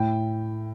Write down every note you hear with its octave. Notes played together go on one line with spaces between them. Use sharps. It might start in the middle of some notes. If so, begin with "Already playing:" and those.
Already playing: A2 G5